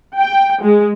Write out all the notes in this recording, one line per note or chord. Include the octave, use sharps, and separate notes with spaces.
G5
G#3